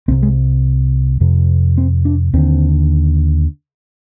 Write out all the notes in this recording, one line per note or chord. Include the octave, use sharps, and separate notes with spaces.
C2 C3 C4
G#3
F2 C3
C4
D4
D#2 D3 C4